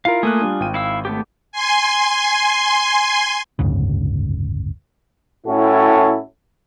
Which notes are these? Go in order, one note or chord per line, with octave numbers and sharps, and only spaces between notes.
E4 F4 A#4 F5
A3 A#3 F4 G#5 D#6 F#6
G3 D4
G#1 G5 D#7
E4 F5 E6
A3 B3 G4
G#5 C6
F#1 D2 G#2 C#3
A2 C#4 E4 F#4 A4